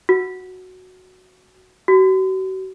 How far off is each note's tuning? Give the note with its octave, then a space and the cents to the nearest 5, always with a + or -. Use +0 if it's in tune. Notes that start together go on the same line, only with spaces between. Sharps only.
F#4 +0
F#4 +40